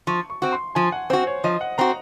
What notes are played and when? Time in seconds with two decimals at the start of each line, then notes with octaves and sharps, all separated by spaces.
0.07 F3 C#6
0.30 C#6
0.42 C4 F#4
0.52 C6
0.75 F3 G#5
0.92 F#5
1.10 C4 F#4 C5
1.27 C#5
1.44 F3 D#5
1.61 F#5
1.78 C4 F#4 A#5